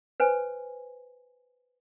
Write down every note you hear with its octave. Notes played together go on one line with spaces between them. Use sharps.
B4 C5 G#5